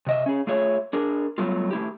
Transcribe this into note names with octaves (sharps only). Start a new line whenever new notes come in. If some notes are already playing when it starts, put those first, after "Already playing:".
C3 D#5 E5
C#4 G#4
A3 F4 G#4 C#5 E5
D4 G#4 A#4
F#3 G3 A3 B3 F4
A3 E4 G4